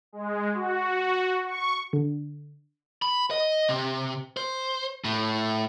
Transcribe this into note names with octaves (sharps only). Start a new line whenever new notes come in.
G#3
F#4
C#6
D3
B5
D#5
C3
C5
A2